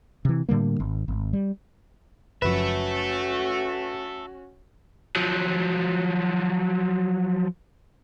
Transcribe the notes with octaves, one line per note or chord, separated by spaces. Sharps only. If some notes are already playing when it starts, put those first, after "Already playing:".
C3 E3
A2 D3 G3 A#3
G#1
G#1
G3
F#1 F#2 F3 C#4 F#4 A4 B4 E5
F3 F#3